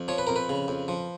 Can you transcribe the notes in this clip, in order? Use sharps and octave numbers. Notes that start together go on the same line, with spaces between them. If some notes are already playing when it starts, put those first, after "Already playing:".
Already playing: F2
F3 C#5
B4
F2 A#4
B4
C#3
F2
F3